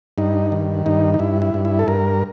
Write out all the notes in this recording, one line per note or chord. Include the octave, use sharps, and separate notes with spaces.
G2 D#4
D#3
G2 D#4
D#4
G2 E4
E4
G2
E4
A4
G2 A#4